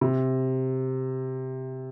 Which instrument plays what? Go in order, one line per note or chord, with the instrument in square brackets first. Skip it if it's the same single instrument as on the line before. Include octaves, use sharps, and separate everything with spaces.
[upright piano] C3